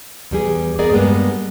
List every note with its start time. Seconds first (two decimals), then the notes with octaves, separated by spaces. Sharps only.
0.31 E2 G3 G#4
0.79 B3 G#4 A#4 D5 D#5
0.91 G2 G3 G#3 A#3 B3